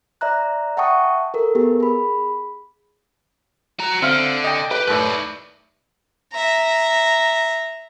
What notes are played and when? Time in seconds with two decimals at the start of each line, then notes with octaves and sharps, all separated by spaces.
0.21 D5 E5 A#5 F#6
0.77 E5 F#5 G5 A5 C#6 D#6
1.34 A4 A#4
1.55 B3 G4 G#4 A#4
1.80 G#4 B5
3.80 F#4 A#5
4.02 D3 C4 E5 F5
4.44 D#5 G5
4.71 G4 B4
4.88 D#2 A2 B4 D5
6.33 E5 A#5